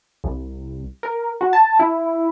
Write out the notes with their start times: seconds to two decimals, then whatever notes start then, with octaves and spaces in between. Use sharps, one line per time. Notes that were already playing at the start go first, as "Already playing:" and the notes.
0.24 C2
1.03 A#4
1.41 F#4
1.53 A5
1.79 E4